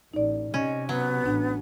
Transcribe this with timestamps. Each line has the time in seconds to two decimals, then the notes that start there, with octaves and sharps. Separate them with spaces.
0.14 A1 D#4 D5
0.54 C3 C#4 D#5
0.89 F#3 B3
1.26 A1 D4